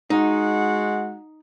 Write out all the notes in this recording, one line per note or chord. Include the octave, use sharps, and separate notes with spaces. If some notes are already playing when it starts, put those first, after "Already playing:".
G#3 D#4 F#4 F#5